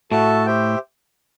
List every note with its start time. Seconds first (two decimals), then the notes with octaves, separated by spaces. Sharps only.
0.11 A2 F#4 A4 E5 A5
0.46 G4 C5 E5 G5